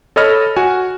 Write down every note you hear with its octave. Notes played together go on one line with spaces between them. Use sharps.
A4 C#5 D#5 B5 F6
F#4 G#5